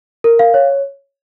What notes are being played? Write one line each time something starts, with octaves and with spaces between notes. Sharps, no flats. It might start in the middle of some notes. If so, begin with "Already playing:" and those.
A#4
F5
C#5